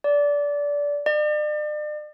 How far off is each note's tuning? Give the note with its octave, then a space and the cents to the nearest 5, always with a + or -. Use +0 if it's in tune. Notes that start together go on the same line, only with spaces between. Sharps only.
D5 -20
D5 +40